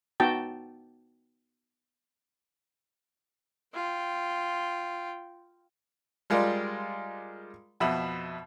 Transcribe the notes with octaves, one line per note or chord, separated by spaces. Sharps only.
B3 D#4 F#4 G5 A5
F4 G5
G3 G#3 F4 A#4 D5
F2 B2 E5 B5